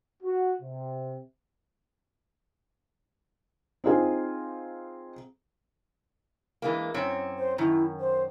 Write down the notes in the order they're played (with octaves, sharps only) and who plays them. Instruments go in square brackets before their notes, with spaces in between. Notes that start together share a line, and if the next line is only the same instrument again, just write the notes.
[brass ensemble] F#4
C3
[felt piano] C4 D#4 F4 G#4
[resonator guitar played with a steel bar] E3 G#3 A#3
F#2 C4 C#5
[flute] C5
[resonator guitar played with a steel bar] F#2 D#3 [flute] E4
[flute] C5